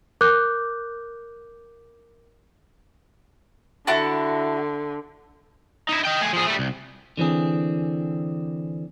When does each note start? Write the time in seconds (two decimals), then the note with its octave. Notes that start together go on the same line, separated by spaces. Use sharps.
0.21 A#4 D6 F#6 G6
3.87 D3 E4 F#4 A5
5.89 D#4 E4
6.05 D#5 G5
6.22 A3 G#4
6.33 F3 G#4
6.47 G3 A3
6.59 C2
7.17 D3 E3 C4 G#4